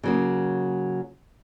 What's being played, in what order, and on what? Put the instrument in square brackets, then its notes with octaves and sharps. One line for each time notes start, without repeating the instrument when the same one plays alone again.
[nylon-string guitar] C#3 F#3 A#3